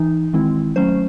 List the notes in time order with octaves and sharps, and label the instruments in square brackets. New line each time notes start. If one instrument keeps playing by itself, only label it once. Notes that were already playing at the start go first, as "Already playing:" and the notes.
Already playing: [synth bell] E3 D#4
D#3 G#3 C4 E4
F#3 A3 C#4 C5